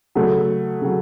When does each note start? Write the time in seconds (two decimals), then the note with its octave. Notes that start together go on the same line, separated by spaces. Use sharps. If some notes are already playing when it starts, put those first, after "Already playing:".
0.15 C#3 F#3 A3
0.82 C#3 F#3